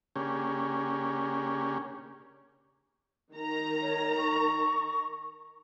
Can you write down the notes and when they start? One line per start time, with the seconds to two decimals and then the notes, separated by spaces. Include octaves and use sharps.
0.16 C#3 A#3 C#4 D4 G4 G#4
3.31 D#3 A#5
3.82 C#5
4.18 C#6